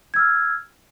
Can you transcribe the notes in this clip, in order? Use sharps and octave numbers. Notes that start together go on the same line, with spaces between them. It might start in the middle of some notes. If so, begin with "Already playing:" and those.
E6 F6 G#6